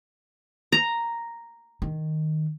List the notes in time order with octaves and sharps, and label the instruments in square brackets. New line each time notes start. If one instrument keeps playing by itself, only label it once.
[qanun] A#5
[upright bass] D#3